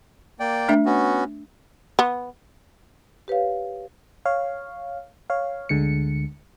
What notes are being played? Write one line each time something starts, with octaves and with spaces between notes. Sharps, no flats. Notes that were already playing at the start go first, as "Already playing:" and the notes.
A#3 D5 G5
A3 D4 E5
B3 C#4 F#4
B3
G4 B4 C#5 F5
C#5 F5
C#5 F5
D2 D3 G#3 C#7